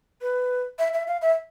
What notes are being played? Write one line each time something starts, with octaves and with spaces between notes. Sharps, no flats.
B4
E5
E5
F5
E5